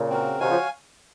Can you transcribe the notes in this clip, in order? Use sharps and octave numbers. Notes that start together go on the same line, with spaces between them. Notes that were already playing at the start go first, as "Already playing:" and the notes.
Already playing: A#2 C#3
C4 F#4 A#4
C3 D#3 F#4 C#5 F5 G#5
C#3 F3